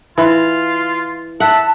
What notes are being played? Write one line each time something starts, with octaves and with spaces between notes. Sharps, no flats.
E3 F4
E5 F#5 A5